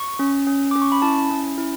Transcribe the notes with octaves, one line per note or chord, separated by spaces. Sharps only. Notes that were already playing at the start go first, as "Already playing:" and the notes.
Already playing: C#6
C#4
C#4
C#4 D6
C#6
B5
E4 A5
C#4
E4